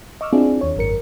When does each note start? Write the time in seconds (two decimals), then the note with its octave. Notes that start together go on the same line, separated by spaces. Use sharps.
0.21 D#5 C#6 D6 E6 F6
0.33 C4 D4 E4 F4 G#4
0.61 D#2 C#5
0.77 G#1 F#2 A#4 C#7